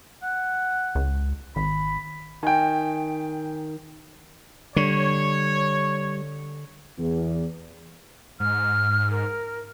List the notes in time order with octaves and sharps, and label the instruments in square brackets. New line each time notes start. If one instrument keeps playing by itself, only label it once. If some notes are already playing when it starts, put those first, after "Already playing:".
[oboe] F#5
[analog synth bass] C#2
[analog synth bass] G#1 [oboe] B5
[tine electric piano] D#3 [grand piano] G5 G#5
[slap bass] D3 [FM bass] G3 [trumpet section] C#5
[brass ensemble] E2
[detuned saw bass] G#2 [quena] F6
[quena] A#4